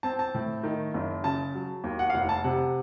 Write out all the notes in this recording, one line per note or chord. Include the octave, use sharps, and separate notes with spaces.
C4 A5
A5
A2
D#3
F#1
C#3 A5
F#3
D#2
F#5
F5
F1 F#5
A5
C3 F#5